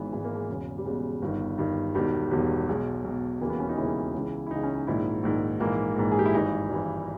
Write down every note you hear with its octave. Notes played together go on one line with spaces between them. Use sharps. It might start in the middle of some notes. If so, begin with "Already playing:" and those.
Already playing: G#1 G#2 E3 B3
G#1 G#2 E3 G#3
A#3
G#3
E1 E2 C#3
G3
E1 E2 C#3 G#3
G1 G2 D#3
G1 G2 D#3
E1 E2 D#3 G3
E1 E2 D#3 G3
B1 B2 G#3
B1 B2
E1 D#2 C#3 E3 A#3
B3
C#4
D#4
E1 D#2 C#3 E3 E4
C#2 C#3 E3
E4
C#2 C#3 E3 D#4
C#4
D#4
A#1 G#2 D#3 E4
A#1 G#2 D#3
A#1 G#2 E3 A#3
A#1 G#2 E3
G#4
G4
E4
G#1 G2 E3 D#4
G#1 G2 E3